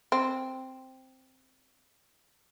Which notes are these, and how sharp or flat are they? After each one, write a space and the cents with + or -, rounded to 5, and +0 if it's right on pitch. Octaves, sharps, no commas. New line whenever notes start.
C4 +0